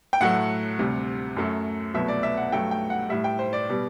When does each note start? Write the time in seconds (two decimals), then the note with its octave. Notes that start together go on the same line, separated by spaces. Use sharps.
0.13 G5
0.21 A2 F#3 A3 F#5
0.79 D2 C3 G3
1.37 F#2 F#3 A3
1.94 C2 B2 F#3 A3 E5
2.08 D5
2.23 E5
2.37 F#5
2.51 G2 F#3 A3 G5
2.71 G5
2.90 F#5
3.09 A2 G3 E5
3.24 G5
3.39 C5
3.53 D5
3.70 B2 G3